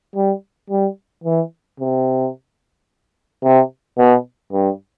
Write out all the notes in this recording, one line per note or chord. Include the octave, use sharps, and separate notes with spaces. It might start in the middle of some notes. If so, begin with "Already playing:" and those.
G3
G3
E3
C3
C3
B2
G2